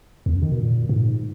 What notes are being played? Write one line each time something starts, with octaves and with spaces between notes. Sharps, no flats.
E2
F#2
D#3
B2
A#2
A#2
G#2